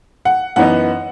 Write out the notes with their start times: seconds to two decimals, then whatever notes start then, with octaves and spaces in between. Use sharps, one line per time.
0.25 F#5
0.56 F#2 E3 B3 D#4 F#5